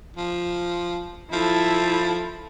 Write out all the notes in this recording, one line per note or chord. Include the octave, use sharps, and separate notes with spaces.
F3
F3 E4 A4